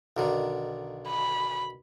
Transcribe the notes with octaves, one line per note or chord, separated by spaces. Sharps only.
B1 D3 D#3
B5